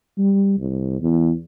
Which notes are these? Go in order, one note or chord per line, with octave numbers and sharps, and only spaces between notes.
G3
C2
E2